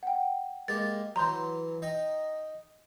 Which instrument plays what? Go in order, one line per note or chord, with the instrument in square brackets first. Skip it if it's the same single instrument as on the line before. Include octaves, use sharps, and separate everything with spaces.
[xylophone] F#5 G5
[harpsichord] G#3 A#3 G4 [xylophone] A6
[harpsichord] E3 F#3 [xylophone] A#5 C6 G6
[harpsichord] D#4 D#5 G5